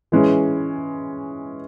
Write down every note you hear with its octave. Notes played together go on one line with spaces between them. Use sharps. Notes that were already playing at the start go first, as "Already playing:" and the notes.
E3 G#3 C#4